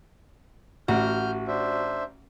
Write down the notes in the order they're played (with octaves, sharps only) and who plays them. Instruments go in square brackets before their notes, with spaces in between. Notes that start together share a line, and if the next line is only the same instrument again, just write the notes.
[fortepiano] A1 [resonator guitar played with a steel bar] F#4 [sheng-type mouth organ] F6 G6
[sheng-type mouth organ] D4 C5 E5